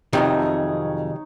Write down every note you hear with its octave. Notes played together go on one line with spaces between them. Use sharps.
F2 G#2 C3 D#3 F#3 D#4 G#4 C#5